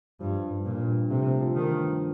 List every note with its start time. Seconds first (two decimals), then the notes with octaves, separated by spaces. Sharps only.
0.20 G2 F3
0.50 G2
0.65 A#2
0.80 G2
1.10 C3 A3
1.41 F3
1.56 D#3
1.70 G2